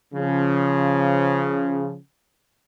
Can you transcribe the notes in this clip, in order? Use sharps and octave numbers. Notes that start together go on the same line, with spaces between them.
C#3 F3